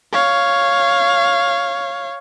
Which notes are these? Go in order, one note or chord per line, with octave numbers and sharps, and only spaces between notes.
C#5 F5